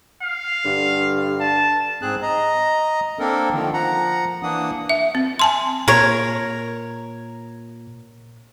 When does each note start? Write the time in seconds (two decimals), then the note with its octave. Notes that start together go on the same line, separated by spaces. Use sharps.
0.22 F5
0.64 G2 D3
1.40 A5
2.02 G#2 C4 G#4 F#6
2.22 D#5 A#5
3.19 A#3 C4 D4 A4 A#4
3.53 D3 D#3 F3
3.74 F3 F#5 A#5
4.43 E3 A#3 D4 F#5 D#6
4.89 E5
5.15 C4
5.39 G#5 A5 C6
5.88 A#2 A#4 C#5